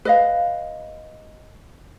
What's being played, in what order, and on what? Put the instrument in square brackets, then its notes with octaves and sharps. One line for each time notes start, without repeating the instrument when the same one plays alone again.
[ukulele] B4 D#5 F5